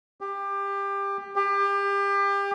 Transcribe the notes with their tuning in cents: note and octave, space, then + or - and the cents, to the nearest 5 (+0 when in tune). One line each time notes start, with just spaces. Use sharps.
G4 +20
G4 +30